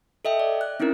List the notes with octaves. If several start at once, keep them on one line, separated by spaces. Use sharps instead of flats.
A4 D#5 E5 G5
D5
F#6
C4 C#4 D#4 E4 A#4